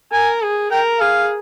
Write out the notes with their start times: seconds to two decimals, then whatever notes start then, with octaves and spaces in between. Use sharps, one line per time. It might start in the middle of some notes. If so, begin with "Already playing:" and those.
0.12 A#4 G#5
0.42 G#4
0.71 A#4 G5
1.00 G#4 F5